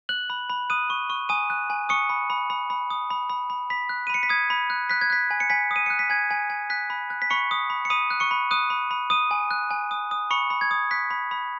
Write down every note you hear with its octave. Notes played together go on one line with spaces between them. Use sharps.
F#6 F#7
B5
B5
D#6 F#6 D#7
C#6
C#6
G#5 D#6 D#7
F#6
G#5
C#6 D#6 C#7
B5
B5
B5
B5
D#6
B5
B5
B5
B5 B6
F#6
D#7
B5 C#7
B6
D#6 G#6
B5
F#6
F#6 B6
G#6
F#6 B6
G#5
C#7
G#5 B6
D#6
D#7
F#6 C#7
B6
G#5 G#6
G#5
G#5
F#6 B6
B5
F#6
B6
B5 C#6 C#7
D#6
B5
C#7
B5 D#6 D#7
F#6
C#6 C#7
B5
D#6 F#6 D#7
B5
B5
D#6 D#7
G#5
F#6
G#5
D#6
D#6
B5 C#6 C#7
B5
G#6
D#6
F#6 B6
B5
B5